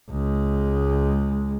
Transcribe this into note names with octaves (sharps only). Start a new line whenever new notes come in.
C#2 G#3